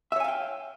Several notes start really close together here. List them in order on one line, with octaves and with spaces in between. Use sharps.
E5 C#5 G#5 F5 G5